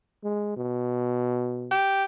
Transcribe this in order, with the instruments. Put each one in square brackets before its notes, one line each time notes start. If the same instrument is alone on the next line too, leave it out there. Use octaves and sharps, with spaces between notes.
[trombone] G#3
B2
[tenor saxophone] G4